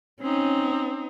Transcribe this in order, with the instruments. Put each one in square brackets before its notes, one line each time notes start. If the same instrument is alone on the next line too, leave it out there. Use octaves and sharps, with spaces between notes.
[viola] C4 D#4 [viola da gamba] C#4